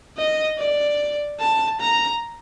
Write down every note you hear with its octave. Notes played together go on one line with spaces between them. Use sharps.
D#5
D5
A5
A#5